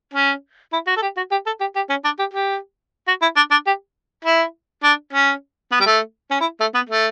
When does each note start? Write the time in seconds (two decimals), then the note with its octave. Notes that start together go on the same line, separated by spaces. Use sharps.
0.13 C#4
0.73 E4
0.87 F#4
0.97 A4
1.02 G4
1.17 F#4
1.31 G4
1.46 A4
1.60 G4
1.76 G4
1.90 C#4
2.05 D4
2.19 G4
2.33 G4
3.08 F#4
3.22 E4
3.36 D4
3.51 D4
3.67 G4
4.25 E4
4.83 D4
5.13 C#4
5.72 B3
5.80 G3
5.86 A3
6.31 C#4
6.41 E4
6.60 A3
6.75 B3
6.89 A3